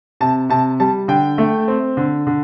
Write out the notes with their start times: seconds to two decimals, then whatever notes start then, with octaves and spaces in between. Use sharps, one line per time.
0.21 C3 A5
0.49 C3 A5
0.80 G3 A5
1.08 D3 G5
1.38 A3
1.68 C4
1.97 D3
2.27 D3